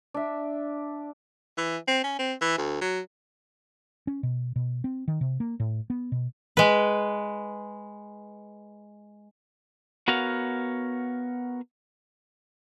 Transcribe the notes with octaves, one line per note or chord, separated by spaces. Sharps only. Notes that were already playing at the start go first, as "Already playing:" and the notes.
D4 E5
E3
C4
C#4
C4
E3
D2
F#3
C#4
B2
B2
C4
D#3
C3
A#3
A2
B3
B2
G#3 B4
B3 F#4 A#4 C#5 F5